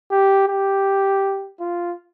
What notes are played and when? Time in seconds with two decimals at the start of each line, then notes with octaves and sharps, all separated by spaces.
0.11 G4
0.48 G4
1.60 F4